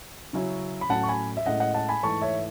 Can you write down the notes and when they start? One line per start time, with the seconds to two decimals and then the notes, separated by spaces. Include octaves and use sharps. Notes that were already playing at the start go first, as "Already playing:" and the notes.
0.33 C#3 F#3 C#4 E4
0.81 B5
0.89 A2 F#3 C#4 F#5 A5
1.03 C#6
1.08 G#5 B5
1.37 E5
1.46 A2 G#3 C#4 E4 D#5 F#5
1.60 D#5 F#5
1.74 F#5 A5
1.89 G#5 B5
2.03 G#2 E3 A3 E4 A5 C#6
2.22 C#5 E5